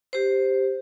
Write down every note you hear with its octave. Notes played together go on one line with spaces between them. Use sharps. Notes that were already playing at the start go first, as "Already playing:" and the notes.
G4 C5